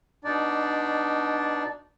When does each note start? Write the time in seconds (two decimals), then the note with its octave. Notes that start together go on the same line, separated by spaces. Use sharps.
0.25 B2 D4 D#4 D5